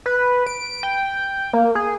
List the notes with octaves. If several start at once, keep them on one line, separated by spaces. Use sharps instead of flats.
B4
D7
G5
A#3
G#4